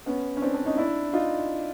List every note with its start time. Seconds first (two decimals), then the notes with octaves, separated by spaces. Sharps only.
0.06 B3 C#4
0.37 C#4
0.42 C4 D4
0.54 C4 D4
0.66 C#4 D#4
0.77 D4 E4
1.13 D#4 F4